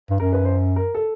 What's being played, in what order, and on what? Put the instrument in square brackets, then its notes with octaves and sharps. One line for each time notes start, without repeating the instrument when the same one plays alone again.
[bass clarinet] G2
[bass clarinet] F#2 [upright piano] A#4
[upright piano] B4
C5
A#4
A4